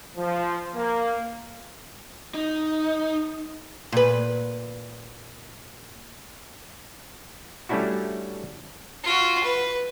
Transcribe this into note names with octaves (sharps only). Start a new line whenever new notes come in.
F3
A#3
D#4
A#2 B4
G3 A3 C#4 D4 E4 F#4
F4 F#4
B4